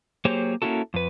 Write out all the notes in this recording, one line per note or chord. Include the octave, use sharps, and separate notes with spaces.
F#3 A#3 G4 G#4 C5 C#5
A#3 C#4 E4 F#4 A4
F2 B4